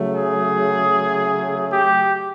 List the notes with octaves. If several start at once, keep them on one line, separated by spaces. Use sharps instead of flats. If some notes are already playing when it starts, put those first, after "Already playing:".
Already playing: C#3 F#3 A3
G#4
G4